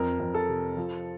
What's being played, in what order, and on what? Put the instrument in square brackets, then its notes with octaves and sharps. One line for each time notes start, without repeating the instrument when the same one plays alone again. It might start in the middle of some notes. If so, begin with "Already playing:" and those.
Already playing: [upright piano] F2 A#4
F2
A4
C3
F3